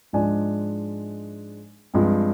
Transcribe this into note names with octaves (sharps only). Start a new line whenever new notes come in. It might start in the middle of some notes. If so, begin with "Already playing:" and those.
G#2 F3 G#3 D4 G#5
G2 F3 G#3 C4